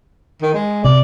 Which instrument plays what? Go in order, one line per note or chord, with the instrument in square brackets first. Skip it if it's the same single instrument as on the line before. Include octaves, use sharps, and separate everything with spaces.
[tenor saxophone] D#3
G#3
[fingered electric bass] C3 [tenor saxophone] D5